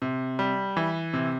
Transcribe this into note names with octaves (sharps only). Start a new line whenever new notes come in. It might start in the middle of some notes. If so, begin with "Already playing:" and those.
C3
G3
E3
C3